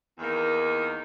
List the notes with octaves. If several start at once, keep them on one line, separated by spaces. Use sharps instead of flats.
E2 D#3 A#3 D#4